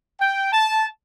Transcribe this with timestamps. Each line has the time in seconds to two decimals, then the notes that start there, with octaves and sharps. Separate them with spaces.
0.20 G5
0.53 A5